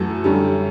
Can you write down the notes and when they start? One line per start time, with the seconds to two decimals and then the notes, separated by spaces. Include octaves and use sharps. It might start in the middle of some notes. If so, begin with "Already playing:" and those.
Already playing: F#2 E3 F#3 A3 F#4 A4
0.24 F#2 D3 G3